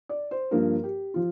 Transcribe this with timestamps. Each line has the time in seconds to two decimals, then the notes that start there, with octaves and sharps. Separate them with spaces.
0.09 D5
0.31 C5
0.51 G2 F3 A#3 A#4
0.84 G4
1.14 F3 F4